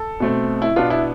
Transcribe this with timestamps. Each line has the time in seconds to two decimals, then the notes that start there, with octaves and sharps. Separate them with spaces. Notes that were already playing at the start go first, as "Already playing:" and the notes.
Already playing: A4
0.20 B2 A3 C4
0.62 E4
0.76 B2 B3 D4 F4
0.90 E4